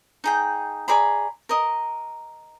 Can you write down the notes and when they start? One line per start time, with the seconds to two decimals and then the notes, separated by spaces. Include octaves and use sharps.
0.24 D#4 G#4 G5
0.88 G#4 D5 A#5 B5
1.49 A#4 D#5